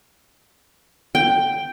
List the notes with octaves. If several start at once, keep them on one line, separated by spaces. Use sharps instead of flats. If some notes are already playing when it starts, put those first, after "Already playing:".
G5